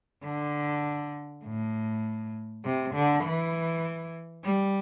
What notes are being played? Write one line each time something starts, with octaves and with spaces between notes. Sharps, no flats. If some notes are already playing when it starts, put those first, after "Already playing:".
D3
A2
C3
D3
E3
G3